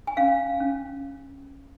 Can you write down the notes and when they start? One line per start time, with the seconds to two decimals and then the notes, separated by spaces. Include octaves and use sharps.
0.07 G#5
0.17 C#4 F5
0.60 C#4